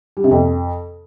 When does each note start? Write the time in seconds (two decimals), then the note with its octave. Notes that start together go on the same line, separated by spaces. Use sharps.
0.17 G3
0.24 C3
0.31 F2